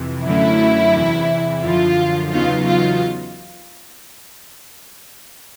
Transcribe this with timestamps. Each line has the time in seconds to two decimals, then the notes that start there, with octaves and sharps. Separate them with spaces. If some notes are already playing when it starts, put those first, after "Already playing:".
Already playing: F2 C3 E3
0.25 F#2 D3 F#3 A3 C#4 E4
0.95 E2 C3 E3
1.63 F#2 D3 F3 F4
2.31 E2 C#3 F#3 B3 D#4 F4
2.66 F4